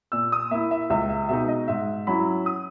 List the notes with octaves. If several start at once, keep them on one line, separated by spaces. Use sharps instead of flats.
A#2 E6
D#6
A#3 E4 E5
E5
C#2 E5
E5
B2 G#3 D#4 E5
D#5
G#2 E5
F#3 C#4 E4 B5
D#6